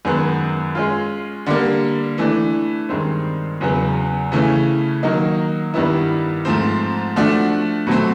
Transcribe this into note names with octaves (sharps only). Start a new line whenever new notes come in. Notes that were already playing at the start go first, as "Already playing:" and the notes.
F#2 D#3 G#3 B3
G#3 C#4 F4
D3 G3 A#3
E3 A3 D4
G2 D#3 G#3 C4
E2 C#3 F#3 B3
C#3 E3 A3 C#4
D#3 F#3 A#3 D#4
G2 D#3 G3 B3 E4
G#2 F3 A3 C4
F3 A3 D4 F#4
B2 F#3 A3 C4